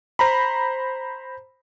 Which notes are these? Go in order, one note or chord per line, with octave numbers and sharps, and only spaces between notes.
C5 A#5 B5